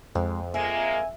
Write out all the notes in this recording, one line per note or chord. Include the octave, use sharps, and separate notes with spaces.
F2 G#3
G#3 A#3 E5 G#5